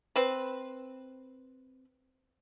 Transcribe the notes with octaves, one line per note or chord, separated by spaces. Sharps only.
C4 B4